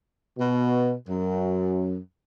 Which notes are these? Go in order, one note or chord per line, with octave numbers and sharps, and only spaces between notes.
B2
F#2